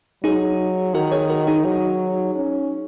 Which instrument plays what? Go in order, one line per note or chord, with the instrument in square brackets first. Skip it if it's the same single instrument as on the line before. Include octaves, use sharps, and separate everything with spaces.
[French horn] F#3 [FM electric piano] D#4 G#4
[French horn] D#3 [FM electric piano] F#4 A#4
[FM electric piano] G#4 C#5
F#4 A#4
D#4 G#4
[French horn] F#3
C#4